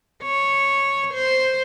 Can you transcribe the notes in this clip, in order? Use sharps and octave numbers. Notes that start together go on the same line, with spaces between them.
C#5
C5